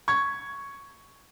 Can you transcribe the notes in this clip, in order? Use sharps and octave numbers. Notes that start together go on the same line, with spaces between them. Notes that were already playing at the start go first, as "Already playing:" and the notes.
C#6 G#6